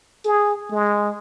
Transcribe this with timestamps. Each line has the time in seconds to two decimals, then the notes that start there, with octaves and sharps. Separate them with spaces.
0.25 G#4
0.70 G#3